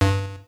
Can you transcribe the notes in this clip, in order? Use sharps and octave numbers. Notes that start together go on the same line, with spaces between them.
G2